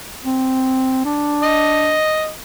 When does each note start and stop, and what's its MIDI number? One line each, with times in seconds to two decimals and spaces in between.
0.24 1.03 60
1.05 1.97 62
1.43 2.30 75